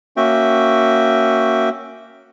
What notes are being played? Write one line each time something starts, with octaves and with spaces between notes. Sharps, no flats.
A#3 C#4 F#4 E5 G5